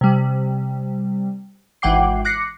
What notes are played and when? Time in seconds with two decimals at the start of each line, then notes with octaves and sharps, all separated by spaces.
0.01 C3 G3
1.82 G#1 E3 F#5 G5 D6 C7
2.25 D6 F#6 A#6 C7 C#7